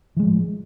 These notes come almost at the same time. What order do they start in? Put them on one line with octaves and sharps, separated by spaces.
E3 G#3 F3 A2